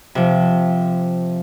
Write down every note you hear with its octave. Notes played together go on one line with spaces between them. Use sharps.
C3 F3